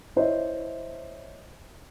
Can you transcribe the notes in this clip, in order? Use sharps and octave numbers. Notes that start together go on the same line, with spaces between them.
E4 C5 C#5 D#5 E5